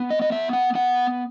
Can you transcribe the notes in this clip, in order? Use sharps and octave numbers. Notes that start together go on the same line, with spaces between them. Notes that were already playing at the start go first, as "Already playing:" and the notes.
Already playing: B3
D#5
D#5
B3 E5
F#5
B3 F#5